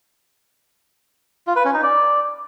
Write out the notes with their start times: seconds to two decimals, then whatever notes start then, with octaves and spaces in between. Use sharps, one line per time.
1.47 F4
1.56 B4
1.65 C#4
1.74 D#4
1.83 D5